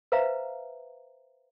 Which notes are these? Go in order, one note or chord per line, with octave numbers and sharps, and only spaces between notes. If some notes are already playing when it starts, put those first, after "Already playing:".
B4 C5 E5 F5 A#5